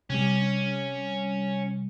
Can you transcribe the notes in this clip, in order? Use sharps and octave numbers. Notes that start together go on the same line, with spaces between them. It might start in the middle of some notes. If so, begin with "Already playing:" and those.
C3 G3 C#4